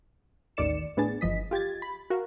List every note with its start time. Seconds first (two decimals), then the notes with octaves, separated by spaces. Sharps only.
0.57 A1 D#2 D#3 D5 C#7 E7
0.97 A2 B3 D4 G#4 A6
1.21 G1 E3 F3 D#5 B6
1.51 F4 G4 G#6 A6
1.82 B5
2.10 F#4 A#4 F5